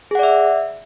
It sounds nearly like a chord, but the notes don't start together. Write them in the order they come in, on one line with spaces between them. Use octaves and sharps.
G#4 F#5 D5 E5